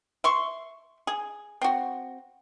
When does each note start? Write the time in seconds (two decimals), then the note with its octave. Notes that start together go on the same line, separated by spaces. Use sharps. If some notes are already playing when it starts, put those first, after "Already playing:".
0.24 E5 C6 C#6
1.07 G#4
1.62 C4 F#4